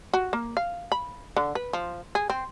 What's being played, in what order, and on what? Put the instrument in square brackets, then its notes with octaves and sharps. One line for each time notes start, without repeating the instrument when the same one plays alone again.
[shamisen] F#4
A#3
F5
B5
D3
B4
F3
G#4
C4